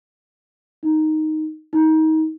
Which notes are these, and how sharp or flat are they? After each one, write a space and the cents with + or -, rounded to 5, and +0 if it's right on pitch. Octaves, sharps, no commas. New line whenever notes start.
D#4 +0
D#4 +25